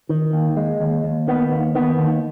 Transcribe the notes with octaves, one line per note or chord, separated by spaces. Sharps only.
D#3
D#2
G#3
D#2
D#2
D#3 B3
D#2
D#3 B3
D#2